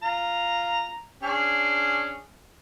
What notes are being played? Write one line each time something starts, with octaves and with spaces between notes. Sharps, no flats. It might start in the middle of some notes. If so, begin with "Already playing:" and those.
F4 A#5
C#4 D4 G#4